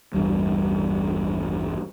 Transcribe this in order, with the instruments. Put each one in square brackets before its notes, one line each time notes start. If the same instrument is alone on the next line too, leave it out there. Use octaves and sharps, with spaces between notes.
[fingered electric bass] A1 E2 G2 G3